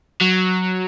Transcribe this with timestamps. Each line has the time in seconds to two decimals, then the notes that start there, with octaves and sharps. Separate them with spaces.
0.21 F#3